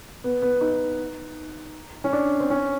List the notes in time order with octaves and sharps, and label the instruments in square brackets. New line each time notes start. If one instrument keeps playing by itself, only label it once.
[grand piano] B3
B3
D#4
C#4
D4
C4
C#4